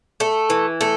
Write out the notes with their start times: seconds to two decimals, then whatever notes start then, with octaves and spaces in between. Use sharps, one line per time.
0.20 A3
0.50 E3
0.81 A3